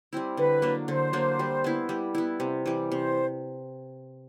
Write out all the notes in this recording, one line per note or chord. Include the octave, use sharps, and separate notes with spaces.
G3 C4 E4
D3 B4
F#3 A#3 D4
D3 C5
F#3 A#3 D4
G3
B3 E4
G3
B3 E4
C3
E3 G3
C3 C5